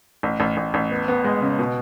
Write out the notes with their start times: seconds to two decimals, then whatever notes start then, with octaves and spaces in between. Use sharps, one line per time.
0.23 A1
0.40 A1
0.57 A1
0.74 A1
0.91 B3
1.08 B3
1.24 G#3
1.42 C#3
1.59 B2